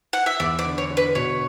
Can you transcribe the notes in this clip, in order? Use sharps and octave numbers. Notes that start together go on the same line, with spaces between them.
F#5
E5
E2 D5
D5
D3
C#5
D3
B4
B2 C#5